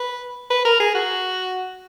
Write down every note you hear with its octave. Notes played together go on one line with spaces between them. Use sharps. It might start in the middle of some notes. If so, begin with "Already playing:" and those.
Already playing: B4
B4
A#4
G#4
F#4